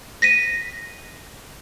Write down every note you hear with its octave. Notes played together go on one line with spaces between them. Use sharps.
A#6 B6 D#7